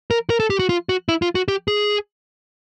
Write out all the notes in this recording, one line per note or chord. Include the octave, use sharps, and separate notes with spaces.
A#4
A#4
A4
G4
F#4
F4
F#4
E4
F4
F#4
G4
G#4